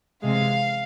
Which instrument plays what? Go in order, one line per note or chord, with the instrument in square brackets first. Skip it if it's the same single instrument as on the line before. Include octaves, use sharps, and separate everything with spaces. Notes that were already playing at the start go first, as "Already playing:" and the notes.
[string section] C3 E3 G#3 F5